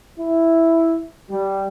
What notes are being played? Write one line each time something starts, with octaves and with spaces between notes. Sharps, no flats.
E4
G3